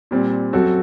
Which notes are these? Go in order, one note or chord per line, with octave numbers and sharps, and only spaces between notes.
A#2 G3 C4
F#2 F#3 C4 F#4 A4